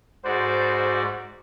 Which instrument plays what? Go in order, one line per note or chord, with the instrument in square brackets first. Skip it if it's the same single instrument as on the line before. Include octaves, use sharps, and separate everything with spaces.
[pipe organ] G#2 F#4 D5 [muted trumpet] C5